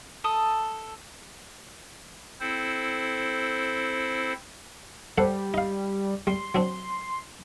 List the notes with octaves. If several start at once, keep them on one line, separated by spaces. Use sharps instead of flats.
A4 D#6
C4 E4 A4 C5
G3 A4 C5 F#5
D#4 F5
G3 C6
F#3 C4 D4